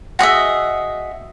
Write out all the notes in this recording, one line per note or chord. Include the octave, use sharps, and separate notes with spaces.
F#4 G#4 D#5 E5